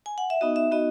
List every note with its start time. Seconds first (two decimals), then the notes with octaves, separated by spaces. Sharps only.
0.06 G#5
0.18 F#5
0.30 E5
0.41 B3 D#4 F#4 D#5
0.56 E5
0.71 B3 D#4 F#4 D#5